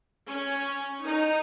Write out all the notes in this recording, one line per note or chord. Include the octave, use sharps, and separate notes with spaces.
C#4
D#4